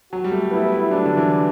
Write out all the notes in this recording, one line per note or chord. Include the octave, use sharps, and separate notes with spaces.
F#3 F#4
G3
A3
B3 E4
A3
F#3 D4
D3
E3